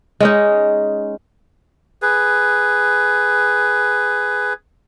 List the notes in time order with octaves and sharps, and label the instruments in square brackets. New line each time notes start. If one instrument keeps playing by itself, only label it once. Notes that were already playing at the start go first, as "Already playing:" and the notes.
[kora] G#3 C#4 D#4
[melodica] G#4 B4